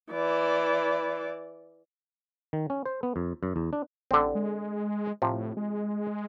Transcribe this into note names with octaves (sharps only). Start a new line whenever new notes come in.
E3 D5
D#3
C#4
C5
B3
F2
F#2
E2
D4
A1 D3 C4
G#3
A2 C3 F3
G#3